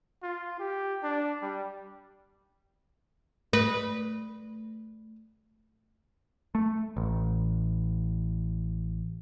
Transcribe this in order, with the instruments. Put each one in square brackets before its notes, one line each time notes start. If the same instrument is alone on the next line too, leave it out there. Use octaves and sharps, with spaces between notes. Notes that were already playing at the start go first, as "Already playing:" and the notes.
[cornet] F4
G4
D4
G3
[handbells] A3 [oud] B4
[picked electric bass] A3
A1